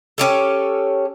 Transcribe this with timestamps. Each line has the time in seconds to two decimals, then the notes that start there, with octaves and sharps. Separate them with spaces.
0.18 C#4 G4 A4